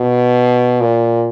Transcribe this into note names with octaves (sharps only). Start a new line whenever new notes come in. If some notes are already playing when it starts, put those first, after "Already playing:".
Already playing: B2
A#2